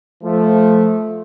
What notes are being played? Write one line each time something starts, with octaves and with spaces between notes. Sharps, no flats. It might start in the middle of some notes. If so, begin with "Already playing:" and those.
F3 A3